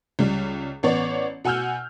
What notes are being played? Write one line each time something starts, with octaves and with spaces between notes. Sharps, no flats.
C#2 G3
A1 B3 C#5 D5
B2 F#5 G#5 E6 F6 G6